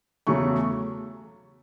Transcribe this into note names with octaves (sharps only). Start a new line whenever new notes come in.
E2 C#3 F#3 A3 C#6